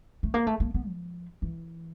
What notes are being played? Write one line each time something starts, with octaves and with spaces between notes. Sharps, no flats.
A3
A#3
A3
A#3
B3
F3
E3